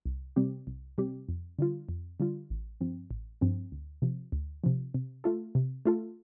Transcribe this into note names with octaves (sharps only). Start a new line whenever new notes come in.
C2
C3 G3 C4 G4
C2
C3 G3 C4 G4
F2
D3 G3 F4
F2
D3 G3 F4
A1
G2 F3 C4
A1
G2 F3 C4
D2
C3 F3
D2
C3 F3
C3
A3 F4 A4
C3
A3 F4 A4